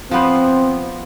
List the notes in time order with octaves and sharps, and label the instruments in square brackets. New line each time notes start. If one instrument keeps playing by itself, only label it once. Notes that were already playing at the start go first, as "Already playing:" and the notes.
[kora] F3 B3 C5 [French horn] C4